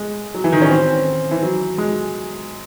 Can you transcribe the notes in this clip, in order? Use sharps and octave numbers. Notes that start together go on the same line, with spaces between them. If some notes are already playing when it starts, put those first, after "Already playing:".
Already playing: G#3
F#3
E3
D#3
C#4
C4
E3
F#3
G#3